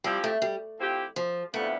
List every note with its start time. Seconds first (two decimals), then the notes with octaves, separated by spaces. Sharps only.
0.04 F3 G3 C4 E4 G4
0.24 A3
0.42 G3
0.80 F3 C4 E4 G4
1.16 F3
1.54 F2 D3 G3 A3 B3 E4